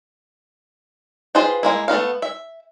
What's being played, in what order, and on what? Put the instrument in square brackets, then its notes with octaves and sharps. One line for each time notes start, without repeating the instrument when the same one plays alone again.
[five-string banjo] F4 G#4 B4 C5 G5
G#3 A#3 E4
A3 B3 D#4 F5
E5